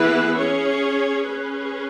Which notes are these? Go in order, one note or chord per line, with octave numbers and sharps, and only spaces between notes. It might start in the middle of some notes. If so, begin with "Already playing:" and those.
Already playing: E3 B3 E4 G#4 B4
C#4 G#4 C#5
C#4 G#4 B4